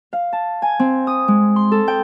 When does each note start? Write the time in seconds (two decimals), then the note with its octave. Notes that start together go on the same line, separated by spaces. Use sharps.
0.13 F5
0.33 A5
0.62 G#5
0.80 C4
1.07 D#6
1.28 G#3
1.56 C6
1.72 A4
1.88 G5